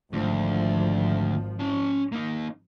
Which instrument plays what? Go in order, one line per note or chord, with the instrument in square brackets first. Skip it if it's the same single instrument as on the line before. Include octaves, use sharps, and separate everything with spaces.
[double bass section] G#1 F3 [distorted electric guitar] D2
[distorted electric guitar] C#4 A5
A#3 D#4